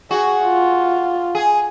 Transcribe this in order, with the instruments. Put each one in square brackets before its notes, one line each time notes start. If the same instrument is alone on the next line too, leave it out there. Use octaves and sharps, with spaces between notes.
[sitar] F#4 [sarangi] G#4
[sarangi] F4
[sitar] G#4